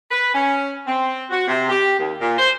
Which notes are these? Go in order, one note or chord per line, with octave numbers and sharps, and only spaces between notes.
B4
C#4
C4
F#4
C3
G4
D#2
A#2
C5